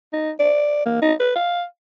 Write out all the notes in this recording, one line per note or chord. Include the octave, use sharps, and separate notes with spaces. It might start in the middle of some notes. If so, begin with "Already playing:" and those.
D#4
D5
A#3
D#4
B4
F5